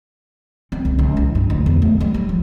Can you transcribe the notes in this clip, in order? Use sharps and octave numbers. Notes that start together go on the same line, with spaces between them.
C4
C#2
C#2
E3
G2
D2
E2
A3
G3
G3
F3